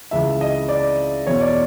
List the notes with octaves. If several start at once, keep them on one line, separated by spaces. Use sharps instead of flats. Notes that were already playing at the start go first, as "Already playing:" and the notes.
C#2 C#3 E3 E5
D#5
D5
E2 B2 C#5
D5